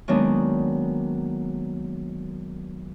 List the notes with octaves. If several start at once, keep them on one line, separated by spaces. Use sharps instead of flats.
D#3 F#3 G#3 A#3 B3 D4